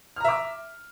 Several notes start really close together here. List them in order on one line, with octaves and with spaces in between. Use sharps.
F6 A#5 E5 D6